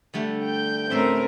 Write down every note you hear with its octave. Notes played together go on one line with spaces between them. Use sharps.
D3 G3 A3
G5 G6
A2 A3 C4 C#4 A#4 E5 C6